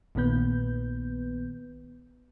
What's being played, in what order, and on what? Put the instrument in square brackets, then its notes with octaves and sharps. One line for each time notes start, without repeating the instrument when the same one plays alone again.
[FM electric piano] A#1 A#2 D#3 B3 B4 G6